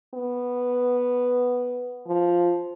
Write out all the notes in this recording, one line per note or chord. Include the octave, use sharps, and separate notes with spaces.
B3
F3